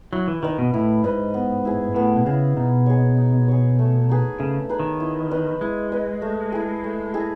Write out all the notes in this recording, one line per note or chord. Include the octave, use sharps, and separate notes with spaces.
F#3 E4
E3
D#3 B4 D#5
B2
A2 E4
G#2 B4 D#5
B3
E4 G#4
A2 B3
B2
C#3 E4 G#4
B2 D#4
G#4 C#5
D#4
G#4 C#5
A3
D#4 G#4 B4
C#3 A3
D#4 G#4 B4
D#3
E4
B4 D#5
G#3 E4
B4 D#5
A3
E4 G#4
A3
E4 G#4